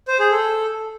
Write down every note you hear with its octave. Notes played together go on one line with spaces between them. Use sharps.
C5
G#4
A4